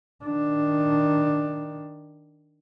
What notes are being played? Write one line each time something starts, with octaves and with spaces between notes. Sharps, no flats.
D#3 D4